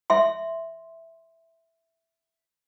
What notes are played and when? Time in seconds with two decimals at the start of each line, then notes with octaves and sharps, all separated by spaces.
0.10 E5 C6